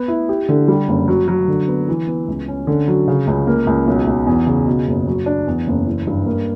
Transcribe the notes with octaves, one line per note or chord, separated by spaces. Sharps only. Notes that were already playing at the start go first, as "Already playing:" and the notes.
Already playing: B3
E4
G4
D3
G3
F#1
F#3
F#3
D3
B3
E3
B3
C#2
C#4
D3
F#3
C#3
C#2
A#3
C#2
B1
B1
E2
C#3
B2
F#1
F#3
D4
E2
F#1
E3
G2
A#3